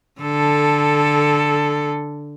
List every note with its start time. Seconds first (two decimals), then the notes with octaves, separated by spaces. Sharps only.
0.21 D3 A4